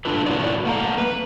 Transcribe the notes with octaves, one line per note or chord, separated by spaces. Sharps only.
D4 F4 A4 B4
E4 F#4 B4 C#5 D5
A3 A#3 F#5 G#5 A#5
B4